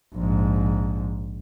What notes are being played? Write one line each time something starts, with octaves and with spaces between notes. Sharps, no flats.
A#1 G#2